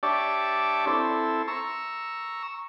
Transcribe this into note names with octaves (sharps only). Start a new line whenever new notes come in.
D4 G4 C#5 D5 E5 A5
C4 E4 A4
A#5 C#6 E6